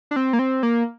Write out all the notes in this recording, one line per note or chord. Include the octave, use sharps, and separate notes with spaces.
D4
C4
A#3
C4
A#3